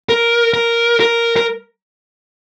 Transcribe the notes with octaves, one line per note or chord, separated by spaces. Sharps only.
A#4
A#4
A#4
A#4